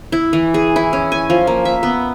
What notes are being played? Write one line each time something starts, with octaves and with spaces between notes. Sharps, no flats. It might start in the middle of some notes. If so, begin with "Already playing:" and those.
E4
E3
G#4
E4
C#4
G#5
F3
A#3
E5
B3